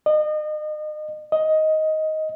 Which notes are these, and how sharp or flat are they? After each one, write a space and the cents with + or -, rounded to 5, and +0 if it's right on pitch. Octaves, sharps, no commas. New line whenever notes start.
D#5 -35
D#5 +10